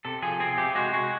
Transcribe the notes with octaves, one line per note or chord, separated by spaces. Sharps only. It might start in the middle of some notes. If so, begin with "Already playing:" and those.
C3 A4
F3 G#4
C4 G#4
C3 G4
G#3 F#4
G#3 F#4